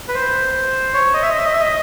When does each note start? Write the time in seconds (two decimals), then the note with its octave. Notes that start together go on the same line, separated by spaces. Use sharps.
0.09 B4
0.15 C5
0.94 C#5
1.14 D#5
1.22 E5
1.29 D#5
1.38 E5
1.45 D#5
1.53 E5
1.60 D#5